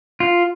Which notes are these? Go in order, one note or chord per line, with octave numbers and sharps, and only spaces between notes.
F4